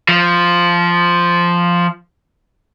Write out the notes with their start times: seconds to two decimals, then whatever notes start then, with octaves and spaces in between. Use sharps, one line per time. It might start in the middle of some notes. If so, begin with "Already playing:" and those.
0.09 F3